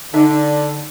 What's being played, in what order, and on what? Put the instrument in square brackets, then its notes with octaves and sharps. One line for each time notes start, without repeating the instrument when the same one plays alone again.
[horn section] D3 [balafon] D#4